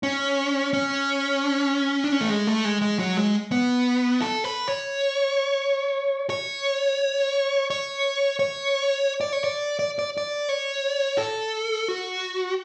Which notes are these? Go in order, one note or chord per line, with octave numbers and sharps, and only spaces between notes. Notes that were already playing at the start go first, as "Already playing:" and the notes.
C#4
C#4
D4
C#4
A3
G#3
A3
G#3
G#3
F#3
G#3
B3
A4
B4
C#5
C#5
C#5
C#5
D5
C#5
D5
D5
D5
D5
C#5
A4
F#4